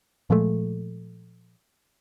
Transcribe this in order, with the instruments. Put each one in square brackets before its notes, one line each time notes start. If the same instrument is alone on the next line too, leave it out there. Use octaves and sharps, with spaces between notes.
[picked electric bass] A#2 F3 G#3 A3